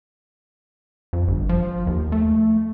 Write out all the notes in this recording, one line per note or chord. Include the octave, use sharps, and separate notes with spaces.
F2
G1
F3
D#2
A3